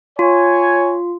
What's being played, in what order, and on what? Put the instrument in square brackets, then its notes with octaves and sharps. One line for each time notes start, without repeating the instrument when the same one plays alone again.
[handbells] F4 [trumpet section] C#5 G#5